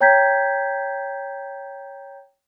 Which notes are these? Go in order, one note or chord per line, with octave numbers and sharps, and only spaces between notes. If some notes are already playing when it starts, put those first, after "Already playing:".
C#5 G5 A#5 G6 G#6 B6